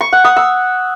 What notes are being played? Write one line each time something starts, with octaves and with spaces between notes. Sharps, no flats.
C#6
F#5
D#6
E6